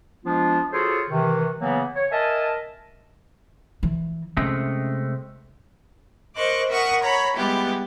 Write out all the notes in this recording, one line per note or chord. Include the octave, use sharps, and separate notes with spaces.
F3 G#3 B3 D4 F4
F4 F#4 G#4 A4 C5 C#5
C3 D#3 E3
C#3 E3 F#3 A#3 B3
C#5
A#4 D#5 E5 G#5 A5
E3
C3 G#3 A3 C#4
A#4 C5 D#5 C#6 D6 F#6
A#4 E5 F#5 C#6 D#6
C#5 A#5 B5
G3 G#3 B3 E4 G4